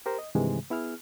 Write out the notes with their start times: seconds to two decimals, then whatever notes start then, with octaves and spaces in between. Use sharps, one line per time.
0.06 G4 A#4 C5
0.19 D#5
0.35 G2 C3 D#3 E3 G#3
0.70 B3 E4 G#4 F6